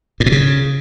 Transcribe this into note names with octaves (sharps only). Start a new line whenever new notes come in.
A2
B2
C#3